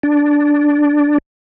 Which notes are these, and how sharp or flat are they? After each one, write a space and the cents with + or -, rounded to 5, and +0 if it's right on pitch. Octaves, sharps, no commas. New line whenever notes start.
D4 -5